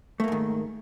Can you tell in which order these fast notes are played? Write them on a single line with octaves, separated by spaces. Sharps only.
A3 A#3 G#2 D#3